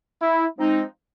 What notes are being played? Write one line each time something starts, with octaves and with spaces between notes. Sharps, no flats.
E4
F3 G#3 C4 D#4